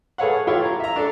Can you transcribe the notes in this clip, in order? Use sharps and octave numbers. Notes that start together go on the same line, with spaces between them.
G#4 A4 B4 C#5 F5 F#5
E4 F4 G4 A4 C#5
F5 A#5
E5 A#5
D4 A4